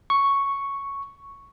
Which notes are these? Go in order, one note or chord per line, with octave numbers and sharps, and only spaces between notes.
C#6